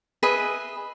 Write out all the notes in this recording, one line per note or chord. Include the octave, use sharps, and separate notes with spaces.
G#4 B4 D#5 E5